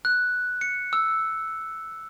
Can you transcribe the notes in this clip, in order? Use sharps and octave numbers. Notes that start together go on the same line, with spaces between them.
F#6
C#7
E6